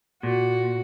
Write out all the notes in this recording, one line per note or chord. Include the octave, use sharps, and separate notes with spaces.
A#2 F#4